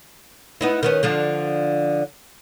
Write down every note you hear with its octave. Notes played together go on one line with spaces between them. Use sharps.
B3 D#4 E4
D#3 B3 C#4
D3 F3 D4